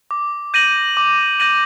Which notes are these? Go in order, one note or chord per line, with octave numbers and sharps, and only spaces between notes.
D6
G6 A#6 D#7 F#7
D6
G6 A#6 D#7 F#7